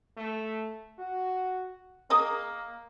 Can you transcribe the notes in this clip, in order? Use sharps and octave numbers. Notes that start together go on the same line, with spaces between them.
A3
F#4
A#3 G#4 A#4 D#5